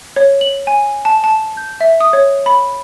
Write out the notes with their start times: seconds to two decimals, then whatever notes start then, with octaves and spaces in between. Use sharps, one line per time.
0.16 C#5
0.41 F#7
0.67 G#5
1.05 A5
1.24 A5
1.57 G6
1.81 E5
2.01 D#6
2.13 C#5
2.46 B5